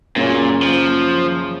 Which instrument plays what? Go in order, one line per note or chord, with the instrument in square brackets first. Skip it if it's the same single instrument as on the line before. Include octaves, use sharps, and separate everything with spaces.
[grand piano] F#2 C#3 F#3 A#3 C#4 [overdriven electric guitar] A#2
[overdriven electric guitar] F3